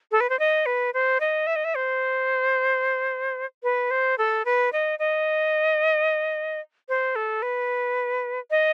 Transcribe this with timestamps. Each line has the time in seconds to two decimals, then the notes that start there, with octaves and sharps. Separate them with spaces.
0.12 A4
0.21 B4
0.30 C5
0.39 D#5
0.66 B4
0.94 C5
1.20 D#5
1.47 E5
1.56 D#5
1.65 E5
1.75 C5
3.63 B4
3.91 C5
4.18 A4
4.45 B4
4.73 D#5
4.99 D#5
6.89 C5
7.16 A4
7.42 B4
8.51 D#5